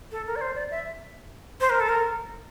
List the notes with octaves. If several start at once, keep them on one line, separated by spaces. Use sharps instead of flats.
A4
A#4
D5
C5
D5
E5
C5
A#4
A4
A#4